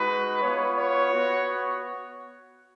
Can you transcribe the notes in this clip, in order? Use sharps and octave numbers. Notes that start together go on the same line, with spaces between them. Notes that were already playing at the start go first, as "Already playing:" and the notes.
Already playing: G#3 D#4 F#4 B4
B3 F4 C#5
C#5
B3 F#4